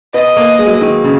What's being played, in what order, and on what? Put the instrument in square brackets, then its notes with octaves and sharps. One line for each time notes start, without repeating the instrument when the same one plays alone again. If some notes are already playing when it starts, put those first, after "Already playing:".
[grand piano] B3 [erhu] D#5
[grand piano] A#3
G#3
F#3
G#3
D#3
C#3